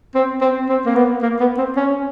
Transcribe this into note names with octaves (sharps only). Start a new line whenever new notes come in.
C4
C4
C4
A#3
B3
A#3
B3
C4
C#4